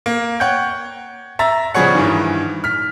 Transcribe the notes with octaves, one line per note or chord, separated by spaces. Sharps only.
A#3
C#5 F#5 G5 G6
E5 A#5 A6
C#3 F3 G3 G#4 C#5 F#5
G2 D#3 E3
F6 B6